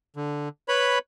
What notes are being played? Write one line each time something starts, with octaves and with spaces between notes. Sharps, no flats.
D3
B4 C#5 B5